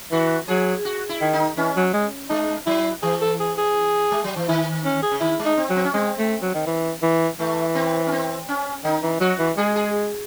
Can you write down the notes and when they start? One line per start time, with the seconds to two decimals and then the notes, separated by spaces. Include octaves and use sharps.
0.12 E3 F#4
0.48 F#3 G#4
0.85 F#4
1.09 E4
1.22 D#3
1.34 D#4
1.57 E3 C#4
1.76 F#3
1.94 G#3
2.30 G#3 D#4
2.66 F#3 E4
3.03 E3 G#4
3.22 A4
3.40 G#4
3.58 G#4
4.12 G#3
4.24 F#3
4.36 E3
4.49 D#3 E4
4.85 C#4
5.03 G#4
5.11 C#3
5.21 D#3 E4
5.39 G#3
5.45 D#4
5.58 C4
5.70 F#3
5.76 C4
5.84 C#4
5.94 G#3 C4
6.19 A3
6.42 F#3
6.55 D#3
6.66 E3
7.02 E3
7.39 E3 A3
7.75 C4
8.07 C#4
8.12 C4
8.49 C#4
8.84 D#3 D#4
9.03 E3
9.21 F#3 F#4
9.39 E3
9.57 G#3 G#4
9.76 G#4